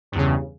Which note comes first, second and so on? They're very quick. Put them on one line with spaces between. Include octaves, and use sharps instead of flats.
G2 E2 C#3